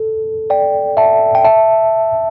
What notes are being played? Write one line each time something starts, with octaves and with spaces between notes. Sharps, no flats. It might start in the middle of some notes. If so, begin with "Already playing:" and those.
Already playing: A4
D5 G5
E5 A5
G5
E5 A5